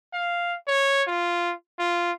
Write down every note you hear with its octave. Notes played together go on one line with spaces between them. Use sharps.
F5
C#5
F4
F4